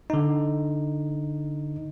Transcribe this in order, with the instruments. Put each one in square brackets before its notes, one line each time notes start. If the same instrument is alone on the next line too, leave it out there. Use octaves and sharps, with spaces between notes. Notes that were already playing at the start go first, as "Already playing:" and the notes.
[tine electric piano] D3 D#4